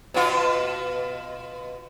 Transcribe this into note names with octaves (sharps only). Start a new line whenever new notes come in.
B2 F4